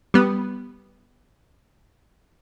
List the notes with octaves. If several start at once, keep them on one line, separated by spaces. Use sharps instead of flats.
G3 B3